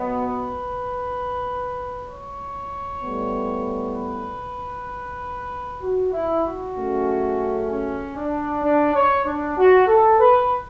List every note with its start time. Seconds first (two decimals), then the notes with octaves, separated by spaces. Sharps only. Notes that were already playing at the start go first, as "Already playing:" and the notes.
Already playing: B2 F#3 B3
0.21 B4
2.07 C#5
3.02 A2 G3 B3
3.95 B4
5.82 F#4
6.13 E4
6.45 F#4
6.76 C#3 F#3 A3 C#4
7.70 C#4
8.17 D4
8.64 D4
8.95 C#5
9.26 D4
9.58 F#4
9.88 A4
10.20 B4